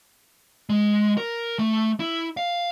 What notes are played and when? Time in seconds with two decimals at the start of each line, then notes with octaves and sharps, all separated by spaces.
0.69 G#3
1.18 A#4
1.59 A3
2.00 E4
2.37 F5